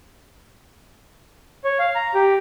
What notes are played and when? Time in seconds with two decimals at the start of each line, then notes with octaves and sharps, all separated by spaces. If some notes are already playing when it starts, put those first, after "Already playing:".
1.64 C#5
1.79 F5
1.95 A#5
2.14 G4